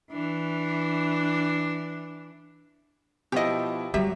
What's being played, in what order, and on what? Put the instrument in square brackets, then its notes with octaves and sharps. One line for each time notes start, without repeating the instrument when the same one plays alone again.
[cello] E3 D4
[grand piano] B2 F3 E4 [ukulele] G4 D#5
[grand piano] F#3 [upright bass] G3 [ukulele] G4 E5